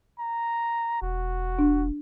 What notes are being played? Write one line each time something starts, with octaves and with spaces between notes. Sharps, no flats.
A#5
E1 F#4
D4